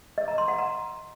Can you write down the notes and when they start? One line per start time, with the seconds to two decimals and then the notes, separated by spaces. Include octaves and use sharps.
0.18 D#5
0.28 A#5
0.38 C6
0.48 F#5
0.58 A#5